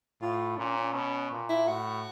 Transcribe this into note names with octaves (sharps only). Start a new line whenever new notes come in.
A2 F4
A#2 C#4
C#4
B2 C#4
A#2
E4
A2 F#4